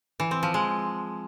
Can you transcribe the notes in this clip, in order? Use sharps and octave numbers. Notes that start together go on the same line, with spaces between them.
E3
C4
F3
G#3